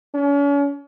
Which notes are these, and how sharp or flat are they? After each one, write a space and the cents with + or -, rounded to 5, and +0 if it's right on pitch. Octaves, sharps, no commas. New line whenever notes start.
C#4 +40